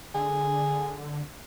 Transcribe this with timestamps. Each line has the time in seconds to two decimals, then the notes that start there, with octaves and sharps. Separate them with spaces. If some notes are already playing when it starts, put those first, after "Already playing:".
0.15 D3 G#4